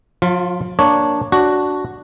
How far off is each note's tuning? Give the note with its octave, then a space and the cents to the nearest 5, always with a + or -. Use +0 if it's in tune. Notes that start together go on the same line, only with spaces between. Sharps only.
F3 +45 F4 +0
A#3 +0 D4 +0 C#5 +0
D4 +0 F#4 +0